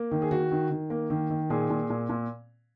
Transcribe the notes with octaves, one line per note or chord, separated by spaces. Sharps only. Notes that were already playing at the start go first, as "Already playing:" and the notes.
Already playing: A#3
D#3
G#4
D#3 F#4
D#3
D#3
A#3
D#3
D#3
A#2 G#4
A#2
A#2
A#2